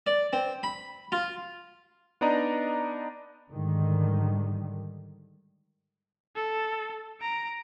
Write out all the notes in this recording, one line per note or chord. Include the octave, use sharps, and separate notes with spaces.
D5
C4
B5
F4
B3 D4 D#4 D5 D#5 A#5
G#2 D3 D#3 G3
A4
A#5 D7